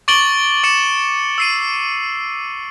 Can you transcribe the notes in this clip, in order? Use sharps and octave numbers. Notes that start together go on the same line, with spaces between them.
C#6 D6 A6 D7 F#7 G7
D6 C#7 E7
E6 C7 D#7